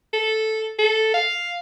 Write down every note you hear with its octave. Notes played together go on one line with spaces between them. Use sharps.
A4
A4
F5